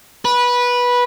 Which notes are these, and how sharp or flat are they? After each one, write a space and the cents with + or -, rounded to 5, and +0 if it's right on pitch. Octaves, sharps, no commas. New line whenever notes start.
B4 -15